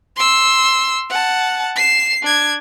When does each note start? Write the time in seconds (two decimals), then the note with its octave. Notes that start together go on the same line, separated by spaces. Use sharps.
0.16 C6 E6
1.10 F#5 A5
1.76 C7 E7
2.23 D4 G#6